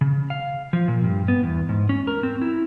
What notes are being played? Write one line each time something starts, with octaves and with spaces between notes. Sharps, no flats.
C#3
F5
F3
A#2
G2
B3
E2
G#2
C#4
A#4
C4
E4